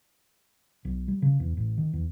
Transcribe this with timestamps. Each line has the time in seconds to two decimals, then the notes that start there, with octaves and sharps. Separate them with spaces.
0.85 B1
1.08 G3
1.22 C#3
1.40 E2
1.57 A1
1.78 D#3
1.93 E2